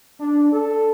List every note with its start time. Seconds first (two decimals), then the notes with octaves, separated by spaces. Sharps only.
0.20 D4
0.53 A4